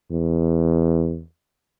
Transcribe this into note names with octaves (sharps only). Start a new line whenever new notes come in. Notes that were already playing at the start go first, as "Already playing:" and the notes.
E2